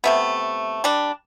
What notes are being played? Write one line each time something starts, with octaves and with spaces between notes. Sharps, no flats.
C3 A3 B3
G3 D4